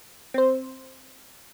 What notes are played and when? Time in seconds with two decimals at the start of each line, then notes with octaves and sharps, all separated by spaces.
0.34 C4 C5